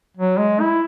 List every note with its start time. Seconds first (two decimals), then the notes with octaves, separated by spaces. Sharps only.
0.17 F#3
0.38 G#3
0.60 E4